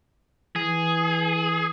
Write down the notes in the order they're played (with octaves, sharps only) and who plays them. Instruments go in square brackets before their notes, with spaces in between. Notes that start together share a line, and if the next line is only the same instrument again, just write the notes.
[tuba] E3 [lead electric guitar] G#4